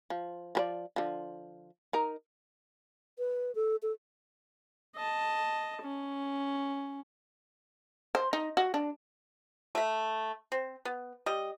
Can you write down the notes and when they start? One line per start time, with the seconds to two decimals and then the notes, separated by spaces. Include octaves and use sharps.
0.10 F3
0.55 F3 C5 D5
0.96 D3 F3
1.93 D#4 A#4
3.18 B4
3.55 A4
3.82 A4
4.96 D#5 A5
5.82 C#4
8.15 C5
8.33 D#4
8.57 F#4
8.74 D4
9.75 A3 E5
10.52 C4
10.85 B3
11.26 G3 D#5